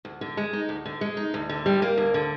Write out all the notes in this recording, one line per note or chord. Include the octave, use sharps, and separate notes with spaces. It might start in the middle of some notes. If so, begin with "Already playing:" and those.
D2
D3
G#3
D#4
D2
D3
G#3
D#4
D2
D3
G3
A#3
D2
D3